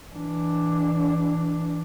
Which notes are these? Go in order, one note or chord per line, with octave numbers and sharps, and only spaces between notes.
E3 D4